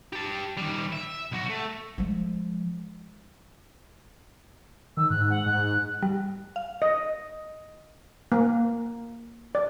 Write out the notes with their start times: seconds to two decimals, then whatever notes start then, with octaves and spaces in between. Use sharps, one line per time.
0.13 G4 A5
0.57 D#3 G3
0.92 E5
1.32 B1 F#4
1.50 A3
1.98 F3 G#3
4.97 D#3 E6
5.10 G#2 F#6
5.30 F#5
5.46 G#2 F#6
6.02 G3
6.56 F5
6.82 D#5
8.32 A#3
9.55 D5